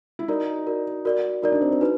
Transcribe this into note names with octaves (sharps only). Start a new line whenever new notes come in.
E4
D#4 F#4 A#4 D5
F#4 A#4 D5
F#4 A#4 D5
D#4 F#4 A#4 D5
D4
C4
C4
D#4 F#4 B4